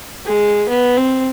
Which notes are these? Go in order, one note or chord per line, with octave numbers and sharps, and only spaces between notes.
G#3
B3
C4